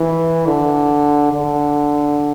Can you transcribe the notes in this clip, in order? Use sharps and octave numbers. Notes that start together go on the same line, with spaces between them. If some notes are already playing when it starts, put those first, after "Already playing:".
Already playing: E3
D3
D3